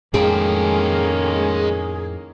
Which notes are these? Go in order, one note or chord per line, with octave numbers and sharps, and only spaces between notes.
F2 A2 D#3 G#3 A#3 C#4 G#4 G5